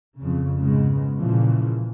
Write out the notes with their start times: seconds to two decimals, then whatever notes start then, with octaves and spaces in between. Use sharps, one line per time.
0.19 F2 C#3
0.58 G#2 C#3 G#3 B3
1.18 A#2 C#3 E3 F3